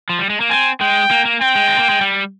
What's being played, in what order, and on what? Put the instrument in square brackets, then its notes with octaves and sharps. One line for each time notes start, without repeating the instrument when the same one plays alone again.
[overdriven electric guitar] F3
G3
G#3
A#3
[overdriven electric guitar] C4 [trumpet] G#5
[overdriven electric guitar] G#3 [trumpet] G5
[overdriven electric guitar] A#3
A#3
[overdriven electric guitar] C4 [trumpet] G5
[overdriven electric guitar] G#3
C4
A#3
G#3
G3